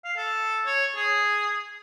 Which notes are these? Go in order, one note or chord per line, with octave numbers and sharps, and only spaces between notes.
F5
A4
C#5
G#4